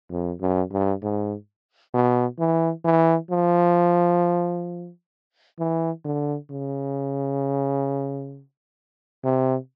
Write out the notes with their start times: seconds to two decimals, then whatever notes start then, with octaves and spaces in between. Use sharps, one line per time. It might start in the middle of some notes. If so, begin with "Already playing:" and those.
0.11 F2
0.41 F#2
0.72 G2
1.02 G#2
1.94 B2
2.39 E3
2.84 E3
3.30 F3
5.59 E3
6.04 D3
6.50 C#3
9.24 C3